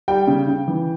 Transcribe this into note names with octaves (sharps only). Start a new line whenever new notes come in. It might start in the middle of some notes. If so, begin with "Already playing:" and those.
G3 G5
C#3
C#3
E3